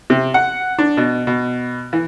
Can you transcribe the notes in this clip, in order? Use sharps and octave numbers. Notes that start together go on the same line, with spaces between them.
C3
F#5
D4
B2
B2
E3